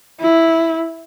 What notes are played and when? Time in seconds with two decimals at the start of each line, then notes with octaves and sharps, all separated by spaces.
0.21 E4